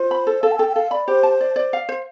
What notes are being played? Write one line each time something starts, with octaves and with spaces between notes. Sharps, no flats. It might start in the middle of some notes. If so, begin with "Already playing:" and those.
Already playing: F4 C5
B5
A4
A4 F5
A5
A4 G5
G5
A4 F5
D5 B5
G4 C5
A5
D5
D5
F5
C5